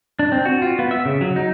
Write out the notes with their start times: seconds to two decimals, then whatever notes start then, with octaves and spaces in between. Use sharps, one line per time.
0.19 D4
0.32 C4
0.45 F#4
0.62 F4
0.79 B3
0.91 E5
1.06 C#3
1.21 F#3
1.36 D#4